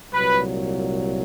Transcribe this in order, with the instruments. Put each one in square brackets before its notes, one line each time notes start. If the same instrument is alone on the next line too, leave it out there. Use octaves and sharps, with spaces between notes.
[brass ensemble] C2 A#2 F#3 B4